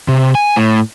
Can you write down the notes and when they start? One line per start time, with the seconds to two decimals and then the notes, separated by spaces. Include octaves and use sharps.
0.08 C3
0.35 G#5
0.56 A2